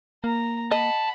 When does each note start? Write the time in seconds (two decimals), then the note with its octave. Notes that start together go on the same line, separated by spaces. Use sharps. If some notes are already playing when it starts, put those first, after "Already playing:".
0.24 A#3 A#5
0.71 D#5 F#5 A5 B5